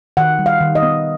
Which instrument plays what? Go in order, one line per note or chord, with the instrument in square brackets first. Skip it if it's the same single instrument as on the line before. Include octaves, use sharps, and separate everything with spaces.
[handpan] D#3 F#5
G3
F5
D#3
D#5
B3